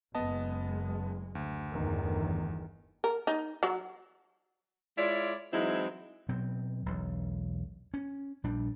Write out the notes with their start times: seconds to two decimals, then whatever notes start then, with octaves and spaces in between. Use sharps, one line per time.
0.15 F#1 G#3 B3 D#5 A5
1.35 D2
1.72 G1 E2 D#3
3.04 A#4
3.27 D#4
3.63 F#3
4.98 G#3 E4 F4 C#5 D5
5.53 E3 F#3 G#3 C4 D#4 E4
6.29 B2 F#3 C4
6.86 E1 B1
7.94 C#4
8.44 A#1 G3 D4